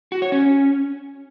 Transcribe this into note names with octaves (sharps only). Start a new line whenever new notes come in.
F#4
C#5
C#4